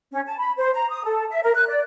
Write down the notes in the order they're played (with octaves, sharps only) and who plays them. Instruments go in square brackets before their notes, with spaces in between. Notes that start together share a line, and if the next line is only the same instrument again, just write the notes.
[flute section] C#4
A5
B5
C5
A#5
D#6
A4
E5
A#4
F#6
D5